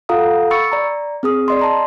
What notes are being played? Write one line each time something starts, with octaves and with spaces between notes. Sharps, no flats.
F4 A4 F5 F#5 A#5 D#6
B5 C#6 E6 A6 C#7
D5 A#5
C4 G#4 D#6
D5 D#5 C6
A5 A#5 C6